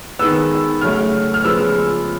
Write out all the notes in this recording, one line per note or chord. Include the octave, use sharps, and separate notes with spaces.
D#3 G#3 B3 E6
C#3 F#3 A3 F6
F6
C#3 F3 G#3 B3 E6